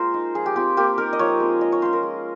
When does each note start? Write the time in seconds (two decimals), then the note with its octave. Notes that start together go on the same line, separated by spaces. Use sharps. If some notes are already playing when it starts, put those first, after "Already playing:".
Already playing: G#3 A#3 F4 A#4 C5
0.14 D#4
0.35 F3 G#4
0.46 G4
0.56 C4 F4 G4
0.77 A#3 G4
0.98 D#4 A#4
1.13 D#5
1.19 F3 C#5
1.40 G#3 C4
1.61 G#3 D#5
1.72 C#5
1.82 C#4 F4 C5
1.93 A#4
2.03 G#3